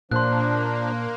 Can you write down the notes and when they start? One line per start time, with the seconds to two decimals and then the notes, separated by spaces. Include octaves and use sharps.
0.11 A#2 F3 A#3 D4 C6 F#6